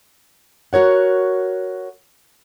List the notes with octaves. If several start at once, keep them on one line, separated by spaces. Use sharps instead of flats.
F#4 A#4 C#5 F#5